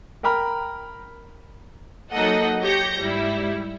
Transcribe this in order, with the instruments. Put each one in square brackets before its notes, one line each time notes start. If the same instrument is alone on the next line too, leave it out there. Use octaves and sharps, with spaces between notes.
[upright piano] A#4 G5 A#5 B5 F6
[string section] F#3 A#3 D#4 A4 D#5 F#5
G4 C#5 G6 A#6 C#7
G#2 G3 E4